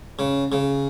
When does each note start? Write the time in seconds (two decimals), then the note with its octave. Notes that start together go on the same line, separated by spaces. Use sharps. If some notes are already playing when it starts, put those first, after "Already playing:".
0.19 C#3
0.52 C#3